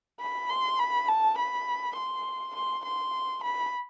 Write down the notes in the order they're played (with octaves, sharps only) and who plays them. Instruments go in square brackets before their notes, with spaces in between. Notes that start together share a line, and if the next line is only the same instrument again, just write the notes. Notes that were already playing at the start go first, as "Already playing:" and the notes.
[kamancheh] B5
C6
B5
A5
B5
C6
C6
C6
B5